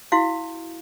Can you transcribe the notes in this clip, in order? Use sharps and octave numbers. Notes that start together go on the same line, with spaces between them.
E4 F#4 F5